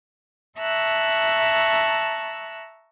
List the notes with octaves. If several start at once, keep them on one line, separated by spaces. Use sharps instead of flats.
E5 A5 A#5 C#6 E6 F#6